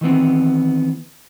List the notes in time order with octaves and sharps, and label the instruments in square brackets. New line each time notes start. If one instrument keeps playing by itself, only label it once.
[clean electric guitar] D#3 E3 B3 C4